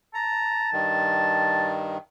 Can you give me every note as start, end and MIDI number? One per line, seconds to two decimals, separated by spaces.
0.14 1.70 81
0.14 0.70 82
0.72 1.98 43
0.72 1.98 51